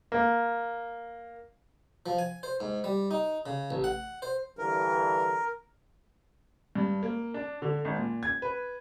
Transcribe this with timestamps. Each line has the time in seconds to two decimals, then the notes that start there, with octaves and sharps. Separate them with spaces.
0.12 A#3
2.06 F3
2.18 G#5
2.43 C5
2.60 G#2
2.84 G3
3.11 D#4
3.46 C#3
3.70 A1
3.84 F#5
4.22 C5
4.58 G2 D3 E3 A#4
6.75 G2
7.03 A#3
7.34 D4
7.62 D3
7.85 G#1
7.97 A#2
8.23 G#6
8.42 B4